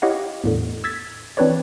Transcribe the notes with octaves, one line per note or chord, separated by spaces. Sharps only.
E4 G4 C#5 D#5 F5 F#5
E2 A2 D3
E6 G#6 A6 B6
E3 C4 D4 B4 C#5 D5